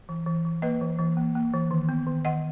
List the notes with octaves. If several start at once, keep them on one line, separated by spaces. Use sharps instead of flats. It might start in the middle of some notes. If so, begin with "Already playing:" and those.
E3
E3
E3
A#3 B4 D#5
E3
E3
A#3
A#3
E3
D#3
B3
D#3
D#3 D#5 F#5